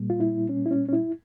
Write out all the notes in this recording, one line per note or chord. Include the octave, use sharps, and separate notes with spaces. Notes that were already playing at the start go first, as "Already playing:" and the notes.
Already playing: A#2 G3 A#3
F4
E4
C#4
E4
C#4
C#4
E4